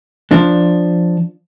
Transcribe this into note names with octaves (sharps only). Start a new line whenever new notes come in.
F3 D4